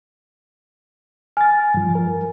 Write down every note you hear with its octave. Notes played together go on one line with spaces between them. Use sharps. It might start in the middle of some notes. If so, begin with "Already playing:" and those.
G#5 F6 A6
G2 F3
A#4